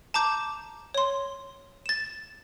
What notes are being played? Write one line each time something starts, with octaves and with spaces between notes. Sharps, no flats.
A5 A#5 D6 G6
C#5 C6
A6 E7